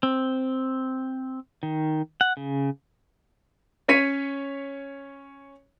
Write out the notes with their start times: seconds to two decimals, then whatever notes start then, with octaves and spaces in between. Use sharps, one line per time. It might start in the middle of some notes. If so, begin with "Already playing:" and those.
0.03 C4
1.63 D#3
2.21 F#5
2.37 C#3
3.88 C#4 C#5 B6 C#7 D#7